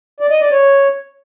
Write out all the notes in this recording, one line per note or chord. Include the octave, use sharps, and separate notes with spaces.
D5
D#5
D5
C#5